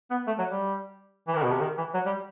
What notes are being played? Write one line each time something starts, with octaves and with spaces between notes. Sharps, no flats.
B3
A3
F#3
G3
E3
D#3
B2
C3
D#3
E3
F#3
G3